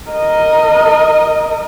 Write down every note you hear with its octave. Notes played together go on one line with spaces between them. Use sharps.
A#4 D#5